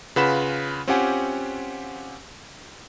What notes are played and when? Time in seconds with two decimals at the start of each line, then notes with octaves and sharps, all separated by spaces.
0.16 C#3 F4 B4 F#5 B5 E7
0.88 C4 C#4 F4 G4 F#5 G#5